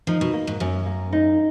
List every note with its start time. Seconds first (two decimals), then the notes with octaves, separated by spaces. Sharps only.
0.07 F3 D#4
0.21 B2
0.33 A#3
0.47 G#2
0.60 F#2 C#4
0.86 A#3
1.13 D#4